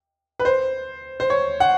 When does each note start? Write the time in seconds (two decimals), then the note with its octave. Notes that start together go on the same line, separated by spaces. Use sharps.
0.40 B4
0.45 C5
1.20 C5
1.30 C#5
1.60 F#5